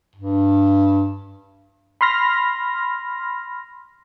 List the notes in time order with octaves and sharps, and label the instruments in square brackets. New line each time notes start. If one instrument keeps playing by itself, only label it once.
[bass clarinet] G2
[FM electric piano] B5 C6 F6 A#6